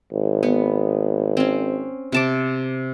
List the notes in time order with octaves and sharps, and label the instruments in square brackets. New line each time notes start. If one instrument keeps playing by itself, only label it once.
[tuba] G#1
[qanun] B3
C4 C#4
C3 A5 D6